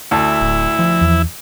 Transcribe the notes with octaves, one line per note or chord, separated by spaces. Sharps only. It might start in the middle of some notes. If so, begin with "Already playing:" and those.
D2 E4 A5
D1
F3
E2